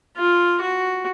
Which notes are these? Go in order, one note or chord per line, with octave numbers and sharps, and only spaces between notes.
F4
F#4